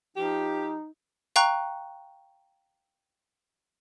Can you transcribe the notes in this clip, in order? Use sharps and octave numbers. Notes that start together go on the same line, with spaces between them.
F3 D#4 G4
F5 G5 A#5 C#6 F#6